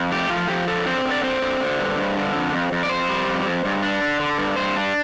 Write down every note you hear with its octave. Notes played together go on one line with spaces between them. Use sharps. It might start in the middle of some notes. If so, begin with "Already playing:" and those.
Already playing: F2
A3 G4
F3 F4
F3 G4
D3 A4
C4 C5
D3
D5
C4 C5
D3
D3
G2
G2
D3
F2
F2
F2
D5
F2 C5
G3
F2
F2
G2
D4
D3
D3
G2
G2 C5
D4